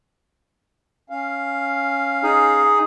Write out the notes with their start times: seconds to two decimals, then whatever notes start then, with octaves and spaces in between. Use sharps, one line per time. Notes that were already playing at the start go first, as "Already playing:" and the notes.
1.10 C#4 F5
2.23 D#4 G#4